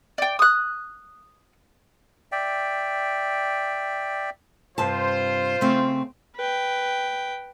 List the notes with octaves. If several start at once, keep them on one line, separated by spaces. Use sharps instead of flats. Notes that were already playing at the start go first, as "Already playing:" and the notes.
D5 G5
D#6 F#6
D5 E5 G5
G2 C3 F4 C5 A5
C#3 A3 C4
B4 G5